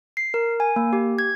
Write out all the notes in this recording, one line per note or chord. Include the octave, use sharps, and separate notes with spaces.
C7
A#4
G#5
A#3
G4
G#6